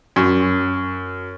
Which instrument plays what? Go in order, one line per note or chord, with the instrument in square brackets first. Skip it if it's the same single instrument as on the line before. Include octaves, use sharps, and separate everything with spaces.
[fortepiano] F#2